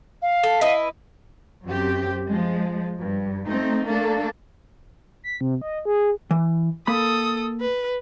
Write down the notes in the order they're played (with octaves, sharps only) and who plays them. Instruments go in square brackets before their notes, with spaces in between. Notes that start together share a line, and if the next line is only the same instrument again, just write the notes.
[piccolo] F5
[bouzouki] A4
E4 B4 D#5
[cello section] F#2 C4 G4
F3 G#3
G2
A3 C4 D#4
A3 A#3 D4 A4
[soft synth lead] B6
C3
D#5
G#4
[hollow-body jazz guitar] E3
[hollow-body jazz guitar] A#3 B5 [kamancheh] A4 D#6
[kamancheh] B4